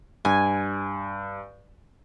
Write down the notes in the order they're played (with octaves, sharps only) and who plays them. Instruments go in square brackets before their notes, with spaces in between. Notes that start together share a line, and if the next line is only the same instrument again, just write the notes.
[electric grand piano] G2 [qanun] G#5